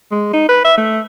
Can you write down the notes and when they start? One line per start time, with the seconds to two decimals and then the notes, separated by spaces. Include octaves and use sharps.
0.11 G#3
0.33 D#4
0.49 B4
0.65 E5
0.77 A3